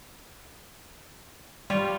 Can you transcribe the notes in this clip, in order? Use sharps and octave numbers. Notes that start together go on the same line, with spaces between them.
G3 F4 C#5